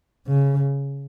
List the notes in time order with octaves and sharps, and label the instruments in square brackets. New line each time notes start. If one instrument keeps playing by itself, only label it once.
[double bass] C#3